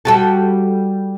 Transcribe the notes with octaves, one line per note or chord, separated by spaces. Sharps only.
G3 F#4 A4